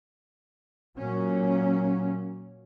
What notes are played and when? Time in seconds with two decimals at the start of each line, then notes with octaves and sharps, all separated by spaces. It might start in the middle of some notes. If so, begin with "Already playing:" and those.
0.98 A#2 F#3 A#3 C#4